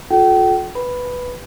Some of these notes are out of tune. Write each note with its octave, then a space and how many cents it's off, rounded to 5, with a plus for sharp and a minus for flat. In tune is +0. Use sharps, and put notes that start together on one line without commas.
F4 +35 A4 -30 G5 -35
B4 +0 B5 +0